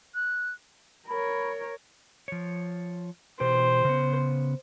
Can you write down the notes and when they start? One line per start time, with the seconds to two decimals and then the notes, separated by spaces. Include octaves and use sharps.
0.14 F#6
1.08 A#4 C#5 B5
2.28 F3 C#5
3.40 B2 E3 G4 C5
3.85 C#3 B3